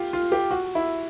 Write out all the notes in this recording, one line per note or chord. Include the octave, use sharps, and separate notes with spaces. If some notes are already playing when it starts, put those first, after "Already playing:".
Already playing: F4 G4
F4
G4
F#4
E4